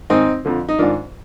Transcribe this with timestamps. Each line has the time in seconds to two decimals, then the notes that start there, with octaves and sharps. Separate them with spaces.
0.10 G#2 D#3 C4 D#4
0.45 F2 D3 F3
0.69 D#4
0.79 G#2 D#3 D4 F4